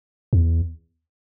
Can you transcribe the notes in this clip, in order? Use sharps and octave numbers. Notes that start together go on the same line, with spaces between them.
E2